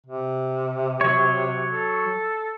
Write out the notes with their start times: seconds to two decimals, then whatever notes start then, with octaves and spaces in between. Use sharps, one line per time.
0.06 C3
1.01 F#3 C#5
1.71 A4